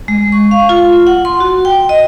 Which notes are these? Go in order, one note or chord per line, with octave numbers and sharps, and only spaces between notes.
G#3
C#6
F5
F4
F#5
C6
F#4
G5
D#5